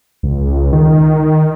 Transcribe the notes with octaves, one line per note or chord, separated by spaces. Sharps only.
C#2
D#3